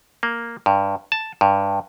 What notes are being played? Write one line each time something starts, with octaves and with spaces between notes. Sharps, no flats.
A#3
G2
A5
G2